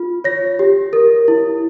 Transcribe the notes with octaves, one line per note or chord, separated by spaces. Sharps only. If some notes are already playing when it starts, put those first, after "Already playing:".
Already playing: F4
C#5 A#6
G4
A#4
E4